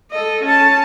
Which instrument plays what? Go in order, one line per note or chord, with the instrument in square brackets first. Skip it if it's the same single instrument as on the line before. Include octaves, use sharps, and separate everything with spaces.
[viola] A4 D#5
C#4 A5